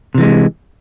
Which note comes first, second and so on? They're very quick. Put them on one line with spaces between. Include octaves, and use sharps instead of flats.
C3 E3 G#3